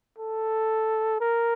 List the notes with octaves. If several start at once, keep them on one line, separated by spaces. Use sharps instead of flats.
A4
A#4